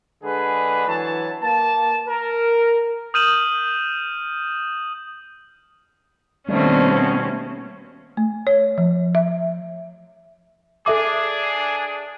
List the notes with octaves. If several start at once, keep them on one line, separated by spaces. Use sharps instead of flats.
D3 G#3 D4 G#4 B4
E3 F#3 C#5 A5
A#3 A5
A#4
D#6 F6 G6 D#7 E7 F#7
B2 D#3 G3 A3 A#3 C4 C#4
A3
C#5
F3
E5
D4 G#4 A4 E5 D6